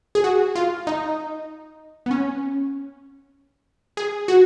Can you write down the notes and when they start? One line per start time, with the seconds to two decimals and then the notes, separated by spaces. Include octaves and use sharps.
0.15 G#4
0.24 F#4
0.55 F4
0.87 D#4
2.06 B3
2.11 C#4
3.97 G#4
4.28 F#4